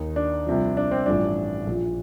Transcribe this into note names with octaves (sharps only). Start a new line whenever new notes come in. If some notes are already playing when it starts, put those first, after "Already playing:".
Already playing: D#2 D#3 D#4
D4
C2 C3 F3
D4
C4
A1 G2 F3 D4
A#1 A#2 F3